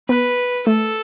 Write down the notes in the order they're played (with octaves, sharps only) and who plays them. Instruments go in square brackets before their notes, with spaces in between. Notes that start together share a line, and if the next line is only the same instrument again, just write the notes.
[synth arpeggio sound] B3 [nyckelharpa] B4
[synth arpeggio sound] A3 [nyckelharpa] A4